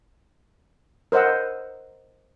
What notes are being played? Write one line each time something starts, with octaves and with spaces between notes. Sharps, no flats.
A#4 C5 D#5 F#5 E6